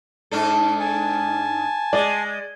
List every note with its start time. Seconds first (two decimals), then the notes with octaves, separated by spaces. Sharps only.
0.31 G#2 D4 A4
0.80 G#5 A5
1.93 G#3 D5